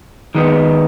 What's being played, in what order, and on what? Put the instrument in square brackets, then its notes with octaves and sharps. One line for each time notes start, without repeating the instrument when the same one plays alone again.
[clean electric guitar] D#3 G#3 B3 D#4